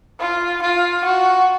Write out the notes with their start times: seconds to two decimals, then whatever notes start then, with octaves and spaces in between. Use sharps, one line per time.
0.20 F4
0.62 F4
1.04 F#4